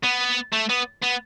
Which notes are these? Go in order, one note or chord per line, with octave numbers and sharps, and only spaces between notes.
B3
A3
B3
B3